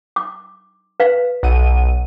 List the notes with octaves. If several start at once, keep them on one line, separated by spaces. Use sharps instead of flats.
D6
B4 F5
B1 F#5 D#7